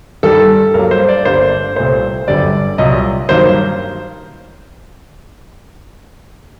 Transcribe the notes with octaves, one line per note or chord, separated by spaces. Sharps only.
G2 D#3 G3 A4
G2 F#3 A#3 A#4
C5
D5
G1 G2 D3 G3 A#3 C5
C2 A#2 A3 C5
G1 F#2 D3 G3 D5
C2 A#2 F#3 A#3 D#5
G2 D#3 F#3 A#3 C5